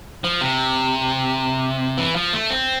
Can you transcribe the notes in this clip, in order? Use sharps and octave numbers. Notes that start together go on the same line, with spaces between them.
F3
C3
E3
F3
A3
C4